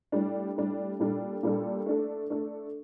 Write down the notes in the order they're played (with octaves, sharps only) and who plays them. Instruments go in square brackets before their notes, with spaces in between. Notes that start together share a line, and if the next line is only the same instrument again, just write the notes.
[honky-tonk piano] A2 G3 D4
A2 G3 D4
A#2 G3 D4 A4
A#2 G3 D4 A4
A3 D4 A4
A3 D4 A4